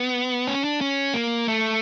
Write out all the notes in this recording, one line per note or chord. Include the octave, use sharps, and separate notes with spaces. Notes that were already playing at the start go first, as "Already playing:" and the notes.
Already playing: B3
C#4
D4
C#4
A#3
A3